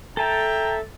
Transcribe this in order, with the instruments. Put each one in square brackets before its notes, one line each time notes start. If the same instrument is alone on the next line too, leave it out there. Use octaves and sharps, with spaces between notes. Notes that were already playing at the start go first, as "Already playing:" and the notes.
[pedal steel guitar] A4 A5 [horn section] E5 G5 A#5